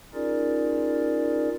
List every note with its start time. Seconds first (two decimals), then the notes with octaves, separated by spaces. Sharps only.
0.14 C#4 D#4 F4 G#4 A#4 D5